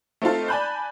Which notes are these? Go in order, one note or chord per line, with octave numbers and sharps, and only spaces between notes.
A3 C4 D#4 F4 A4
D5 G#5 A5 B5 F#6 G6